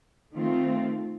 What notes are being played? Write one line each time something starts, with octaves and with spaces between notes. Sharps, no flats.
D#3 A3 C4 F4